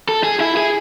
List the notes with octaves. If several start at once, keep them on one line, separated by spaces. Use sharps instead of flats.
A4
G#4
E4
G#4